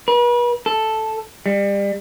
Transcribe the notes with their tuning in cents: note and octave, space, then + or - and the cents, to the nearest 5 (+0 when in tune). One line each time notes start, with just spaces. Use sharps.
B4 -40
A4 -5
G3 +30